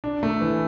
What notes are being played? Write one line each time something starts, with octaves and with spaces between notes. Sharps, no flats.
D4
A3
E3